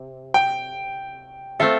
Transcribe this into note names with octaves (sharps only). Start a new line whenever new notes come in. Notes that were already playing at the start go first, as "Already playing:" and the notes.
Already playing: C3
G5
A3 C4 F4 A4 E5